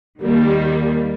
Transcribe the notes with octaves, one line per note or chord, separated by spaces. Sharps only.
D#2 D#3 G3 A#3